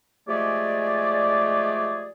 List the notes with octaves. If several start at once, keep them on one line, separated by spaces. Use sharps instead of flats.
F3 G#3 A3 G4 G#4 D5